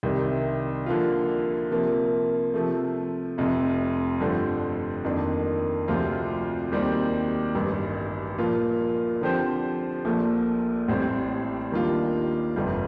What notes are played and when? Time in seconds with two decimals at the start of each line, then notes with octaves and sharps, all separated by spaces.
0.03 C2 C3 D#3
0.86 D3 F3 A#3 F4
1.71 C3 F3 A#3
2.54 C3 F3 A3
3.38 F1 F2 C3
4.20 G2 D3 F3 A3 C4
5.04 F2 D#3 A#3 D4
5.88 D2 C3 F3 C4 F4
6.72 D#2 D#3 G3 C4
7.55 A1 G2 D#3
8.38 A#2 F3 A#3 F4
9.21 D3 F3 C4 G4 C5
10.05 A#1 A#2 F3 A3
10.88 A1 A2 G3 C4
11.72 D#2 D#3 G3 D4 F4
12.56 G1 F2 C3 G3